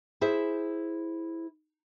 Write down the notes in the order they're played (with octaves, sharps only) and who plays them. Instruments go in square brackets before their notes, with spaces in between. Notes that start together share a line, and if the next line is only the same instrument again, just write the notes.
[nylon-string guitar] E4 G#4 C5 E5